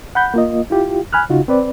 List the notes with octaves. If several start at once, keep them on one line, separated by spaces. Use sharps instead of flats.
F#5 B5 G6
A#3 F4 D#5
E4 F4 G4
G#5 B5 F6 F#6
C#3 D#4 F4 F#4
C4 B4 D5